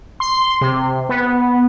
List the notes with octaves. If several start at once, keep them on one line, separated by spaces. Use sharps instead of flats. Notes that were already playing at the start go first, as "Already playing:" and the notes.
C6
C3
B3